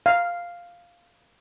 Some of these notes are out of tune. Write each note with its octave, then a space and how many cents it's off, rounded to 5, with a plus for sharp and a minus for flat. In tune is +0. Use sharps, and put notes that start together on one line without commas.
F5 +0